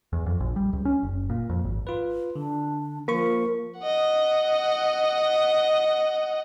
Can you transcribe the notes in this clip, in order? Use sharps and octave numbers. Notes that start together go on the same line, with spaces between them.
E2
F2
A#1
G3
C#2
C#4
F#1
A#2
F2
G#1
F4 B4
D3 D4
F3 A#3 A#4 C#6
D#5 F#5